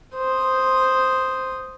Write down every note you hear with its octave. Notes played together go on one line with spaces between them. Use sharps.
C5 D#6